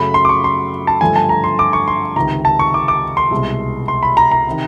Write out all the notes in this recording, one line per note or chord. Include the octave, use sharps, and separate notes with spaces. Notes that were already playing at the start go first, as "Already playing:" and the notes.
Already playing: F#2 C#3 F#3 A3 B5
C6
D6
C#6
C6
A5
G2 D3 F3 A3 G#5
A5
A#5
C6
D6
C#6
C6
C#2 C3 D#3 A#5
A5
C#6
D6
D6
C6
C2 B2 G#3
C6
B5
A#5
A#5
C3 D#3